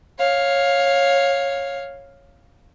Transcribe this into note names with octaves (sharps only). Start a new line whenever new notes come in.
C#5 F5